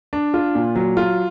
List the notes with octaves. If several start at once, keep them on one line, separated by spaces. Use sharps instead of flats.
D4
F4
A#2
F#3
F4